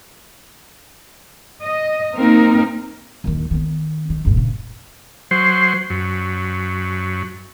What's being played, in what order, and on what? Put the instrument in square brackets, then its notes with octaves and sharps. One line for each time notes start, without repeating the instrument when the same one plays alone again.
[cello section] D#5
A#3 C4 D#4 A#4
[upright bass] D#2 D#3
D#3 B3
D#3
A#1 G2
C#3
[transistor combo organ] F#3 C5
F#2